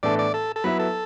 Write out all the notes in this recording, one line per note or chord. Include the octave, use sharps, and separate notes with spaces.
A2 E3 B3 D4 A4 D5
D5
A4
A4
F#3 B3 E4 B4
A4